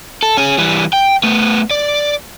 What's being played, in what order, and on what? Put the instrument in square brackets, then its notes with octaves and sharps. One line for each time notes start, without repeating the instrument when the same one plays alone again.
[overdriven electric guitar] A4
C#4 G#4
E3 G3
G5
A3 B3
D5